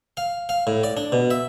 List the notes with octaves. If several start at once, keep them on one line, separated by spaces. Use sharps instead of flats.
F5
F5
A2
D5
D4
B2
E5